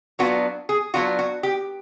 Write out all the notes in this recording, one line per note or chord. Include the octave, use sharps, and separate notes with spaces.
F#3 B3 D4 F4 F#4
G#4
F#3 B3 D4 F4 F#4
F#4
G4